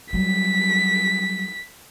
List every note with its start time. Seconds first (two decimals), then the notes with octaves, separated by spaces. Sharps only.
0.13 F#3 G3 B6